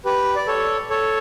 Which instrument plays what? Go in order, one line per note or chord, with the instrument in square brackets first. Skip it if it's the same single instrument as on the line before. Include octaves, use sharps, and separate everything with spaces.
[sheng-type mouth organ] G4 B4
D5
A4 C#5
A4 C#5